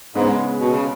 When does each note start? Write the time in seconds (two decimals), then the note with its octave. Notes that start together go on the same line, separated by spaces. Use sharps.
0.15 G#2 C#3 G#3 B3
0.59 B2
0.72 C#3